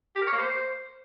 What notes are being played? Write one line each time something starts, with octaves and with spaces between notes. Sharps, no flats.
G4
A#4
C#5
A#3
C5